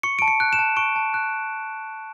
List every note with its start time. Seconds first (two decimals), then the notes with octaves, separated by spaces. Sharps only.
0.03 C#6 C#7
0.19 A5 D7
0.28 C#7
0.40 F#6
0.53 E7
0.59 A5
0.77 C#6 D7
0.96 A5
1.14 F#6